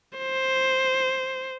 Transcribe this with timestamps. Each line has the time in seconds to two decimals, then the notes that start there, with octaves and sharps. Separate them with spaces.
0.18 C5